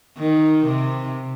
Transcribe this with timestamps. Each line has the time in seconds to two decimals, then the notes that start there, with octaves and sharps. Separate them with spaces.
0.17 D#3
0.64 C3